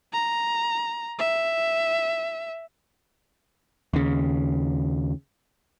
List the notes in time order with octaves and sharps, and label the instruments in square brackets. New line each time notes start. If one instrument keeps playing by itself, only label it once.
[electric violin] A#5
E5
[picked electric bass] D#2 C#3